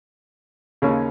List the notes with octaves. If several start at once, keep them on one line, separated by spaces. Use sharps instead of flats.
D#2 C#3 A#3 C#4